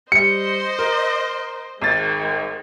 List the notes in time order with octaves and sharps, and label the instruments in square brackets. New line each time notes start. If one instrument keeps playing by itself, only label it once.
[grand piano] G3 [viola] C5 D#5 [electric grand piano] C#7
[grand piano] A#4
[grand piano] G#1 A6 [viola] D#3 G#3